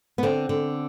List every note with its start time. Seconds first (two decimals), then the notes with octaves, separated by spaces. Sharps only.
0.18 B3
0.23 D3 C4
0.49 D3